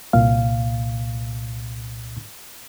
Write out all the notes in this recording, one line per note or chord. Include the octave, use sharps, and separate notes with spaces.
C2 A#2 F5